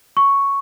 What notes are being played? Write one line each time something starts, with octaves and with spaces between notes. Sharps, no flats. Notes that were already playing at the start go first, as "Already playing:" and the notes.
C#6